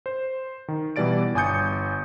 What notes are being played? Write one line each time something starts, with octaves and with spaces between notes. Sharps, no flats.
C5
D#3
B2 E3 G3 D5 A6 D7
G1 G#5 D#6 G6 C#7